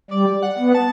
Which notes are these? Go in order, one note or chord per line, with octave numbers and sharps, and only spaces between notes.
G3 D5
F#5
B3
A5